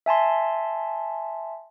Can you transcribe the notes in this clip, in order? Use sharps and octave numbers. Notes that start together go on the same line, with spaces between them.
E5 G#5 A5 C6